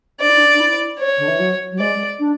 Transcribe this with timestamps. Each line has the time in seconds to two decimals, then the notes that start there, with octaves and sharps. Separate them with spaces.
0.20 D4 D5
0.28 E4
0.37 D4
0.54 D4
0.60 E4
0.99 C#5
1.17 D3
1.28 E3
1.39 F#3
1.71 F#3
1.79 G#3 D5
2.19 D4